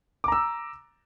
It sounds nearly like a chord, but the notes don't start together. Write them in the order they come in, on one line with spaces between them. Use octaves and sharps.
D6 A#5 E6